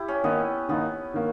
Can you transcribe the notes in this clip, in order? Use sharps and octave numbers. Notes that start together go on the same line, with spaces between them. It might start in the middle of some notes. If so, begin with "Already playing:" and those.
Already playing: E4 G4
C#4
D#3 A#3 B3 D#4
D#3 A#3 B3 D#4
D#3 A#3